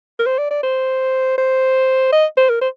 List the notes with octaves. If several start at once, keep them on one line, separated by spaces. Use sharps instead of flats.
A#4
C5
D5
D5
C5
C5
D#5
C5
A#4
C5